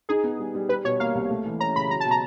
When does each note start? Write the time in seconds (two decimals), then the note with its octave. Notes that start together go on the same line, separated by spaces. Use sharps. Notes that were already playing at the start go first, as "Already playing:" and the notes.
0.09 D#4 G#4
0.24 B3
0.39 G3
0.55 G3
0.69 G3 B4
0.84 B2 C#5
1.00 A#3 F5
1.15 C2
1.30 A3
1.45 E3
1.60 C#4 A#5
1.76 C#3 B5
1.90 F#3 A#5
2.00 A5
2.05 B2
2.11 A#5